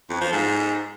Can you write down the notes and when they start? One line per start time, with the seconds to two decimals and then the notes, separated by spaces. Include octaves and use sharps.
0.10 F2
0.21 F3
0.32 G#2